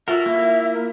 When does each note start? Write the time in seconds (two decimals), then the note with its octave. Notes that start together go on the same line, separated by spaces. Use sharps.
0.08 F4 F#4 A4 A#4 E5 F#5
0.26 A#3 E4
0.74 A#4